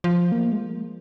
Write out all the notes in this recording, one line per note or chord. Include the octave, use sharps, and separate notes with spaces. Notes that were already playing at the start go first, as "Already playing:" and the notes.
F3
A#3
G#3